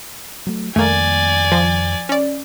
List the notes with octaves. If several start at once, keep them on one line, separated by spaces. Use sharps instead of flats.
F#3 A3
F2 D#3 G3 A3 A#3 D5 G#5
F3
C#4 D5